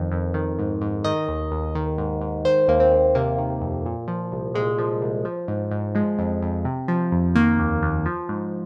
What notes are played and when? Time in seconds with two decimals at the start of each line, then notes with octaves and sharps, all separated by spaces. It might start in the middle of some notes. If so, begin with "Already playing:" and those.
Already playing: F2 D#3
0.12 F2
0.34 D#3
0.59 G#2
0.81 G#2
1.04 D#3 D#5
1.28 D#2
1.52 D#2
1.75 D#3
1.98 G#2
2.21 G#2
2.45 D#3 C5
2.68 D#2 A#3
2.80 C4
2.92 D#2
3.15 C3 A#3
3.38 D#3
3.61 F2
3.86 A#2
4.08 F3
4.32 C2
4.54 A#2 G#3
4.78 F3
5.02 C2
5.25 F3
5.48 G#2
5.71 G#2
5.95 F3 G#3
6.19 F2
6.42 F2
6.65 C3
6.88 F3
7.12 F2
7.35 D#3 A#3
7.59 D#2
7.82 D#2
8.06 F3
8.29 G#2